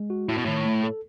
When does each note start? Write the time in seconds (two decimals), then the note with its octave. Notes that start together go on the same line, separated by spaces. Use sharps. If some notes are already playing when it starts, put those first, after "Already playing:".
Already playing: G#3
0.10 F#4
0.28 A2 E4
0.37 B2
0.45 A2 D#3
0.66 A3
0.83 A4